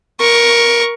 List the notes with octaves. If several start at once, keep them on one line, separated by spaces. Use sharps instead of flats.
A#4 C#6